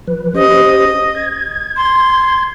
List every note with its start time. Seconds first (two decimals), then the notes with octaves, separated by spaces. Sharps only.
0.08 F3 B4
0.35 C#4 G4 C5 D#5
1.15 G#6
1.76 C6